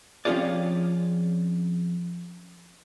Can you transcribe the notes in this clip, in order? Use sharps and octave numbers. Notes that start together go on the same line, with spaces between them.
F3 C4 C#4 F4 G#4 D5